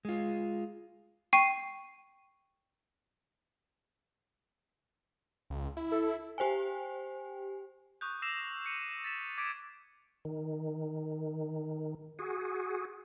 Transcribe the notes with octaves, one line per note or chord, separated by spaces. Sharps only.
G#3 F4
G5 C#6 C7 D#7
C#2
E4
A4
G4 C5 G5 G#5
C#6 D#6 F#6 G6
D6 E6 A#6 C7 E7 F7
G6 C#7 D#7
A6 B6 E7
D6 G#6 B6 D7
D#3
F#4 G#4